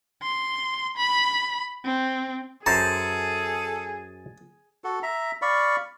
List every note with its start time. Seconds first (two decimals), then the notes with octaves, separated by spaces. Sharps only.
0.23 C6
0.97 B5
1.85 C4
2.66 F#2 G#4 A4 C5 A5 A#5
4.84 F#4 A4
5.03 E5 A#5
5.42 D5 F5 B5 C#6